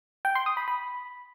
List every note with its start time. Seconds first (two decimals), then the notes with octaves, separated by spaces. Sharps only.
0.25 G5
0.35 C6
0.46 D#6
0.57 B5
0.68 B5